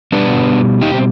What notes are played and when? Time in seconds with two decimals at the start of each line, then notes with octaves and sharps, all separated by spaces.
0.12 B2 G3 B3 D4
0.81 D#4 G4
0.94 C4